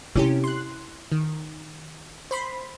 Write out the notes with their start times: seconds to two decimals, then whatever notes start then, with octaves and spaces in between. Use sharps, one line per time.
0.15 C3 C#4 E4 G4
0.44 C6 F#6
1.12 D#3
2.31 C5 B5 C6